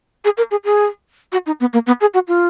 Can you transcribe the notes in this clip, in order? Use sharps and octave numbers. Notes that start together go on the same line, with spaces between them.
G#4
A#4
G#4
G#4
F#4
D#4
B3
A#3
B3
G#4
F#4
F4